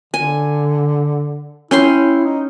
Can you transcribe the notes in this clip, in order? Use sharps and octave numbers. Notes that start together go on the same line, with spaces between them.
D3 G#5
C#4 E4 G5 C6
D#4